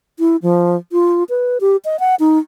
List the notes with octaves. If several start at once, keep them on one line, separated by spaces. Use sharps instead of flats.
E4
F3
F4
B4
G4
D#5
F#5
D#4